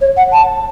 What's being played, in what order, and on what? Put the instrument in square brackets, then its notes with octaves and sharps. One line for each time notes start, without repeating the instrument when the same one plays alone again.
[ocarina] C#5
F#5
A5